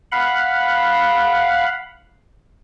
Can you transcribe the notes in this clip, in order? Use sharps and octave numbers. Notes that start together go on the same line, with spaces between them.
F5 F#5 B5